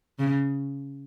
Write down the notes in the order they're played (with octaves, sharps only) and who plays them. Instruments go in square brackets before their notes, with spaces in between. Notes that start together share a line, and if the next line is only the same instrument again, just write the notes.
[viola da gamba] C#3